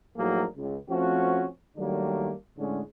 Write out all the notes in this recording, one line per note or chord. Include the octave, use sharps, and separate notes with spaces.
A2 F3 F#3 A#3 D#4 G#4
C#2
F3 A3 C4 C#4 F#4
D#3 F#3 G3 A3 A#3 D4
A2 D3 G#3 C#4